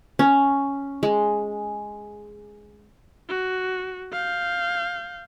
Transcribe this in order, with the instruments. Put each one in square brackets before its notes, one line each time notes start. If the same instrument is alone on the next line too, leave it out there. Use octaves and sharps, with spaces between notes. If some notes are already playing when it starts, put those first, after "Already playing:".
[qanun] C#4
G#3
[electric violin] F#4
F5 G6